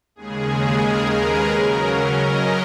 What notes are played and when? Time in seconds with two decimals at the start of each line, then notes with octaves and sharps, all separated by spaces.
0.16 D#2 C#3 G#3 G#4
0.83 A#4
1.16 B4
1.50 C#3 F#3 C#4 A#4
2.18 D#5